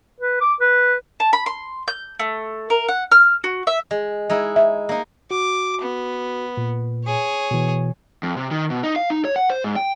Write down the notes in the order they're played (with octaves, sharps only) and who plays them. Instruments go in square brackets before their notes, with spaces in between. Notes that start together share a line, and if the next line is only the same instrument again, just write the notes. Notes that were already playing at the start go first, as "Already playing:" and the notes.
[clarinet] B4
D6
B4
[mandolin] A5
B5
C6
G6
A3
A#4
F#5
F6
F#4
E5
[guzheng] G#3
G#3 D#4 E4
[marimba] E5
[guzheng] A#3 D#4
[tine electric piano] F#4 [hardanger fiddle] D6
[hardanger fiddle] B3
[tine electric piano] A#2
[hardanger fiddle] G#4 C#5
[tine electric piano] B2 E3
[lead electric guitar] F2
C3
D#3
B2
D#4
F5
D#4
C#5
F#5
C5
G#2
G5